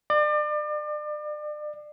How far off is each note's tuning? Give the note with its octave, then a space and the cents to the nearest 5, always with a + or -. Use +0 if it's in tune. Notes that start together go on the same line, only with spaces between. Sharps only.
D5 +35